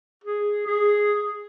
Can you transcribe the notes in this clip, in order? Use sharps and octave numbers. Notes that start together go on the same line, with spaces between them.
G#4
G#4